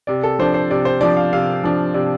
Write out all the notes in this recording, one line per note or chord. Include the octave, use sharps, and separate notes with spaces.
C3 D5
A4
F3 D4 C5
C5
C3 D5
C5
F3 D4 D5
F5
C3 F5
F3 D4
C3 D5